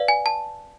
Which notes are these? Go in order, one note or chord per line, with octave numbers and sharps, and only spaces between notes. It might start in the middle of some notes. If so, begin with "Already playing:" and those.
Already playing: B4 D5 F5
G#5
A5